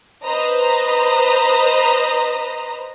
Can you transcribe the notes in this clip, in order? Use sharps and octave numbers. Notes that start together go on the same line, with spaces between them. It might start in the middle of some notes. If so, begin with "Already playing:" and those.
B4 C5 D#5 A#5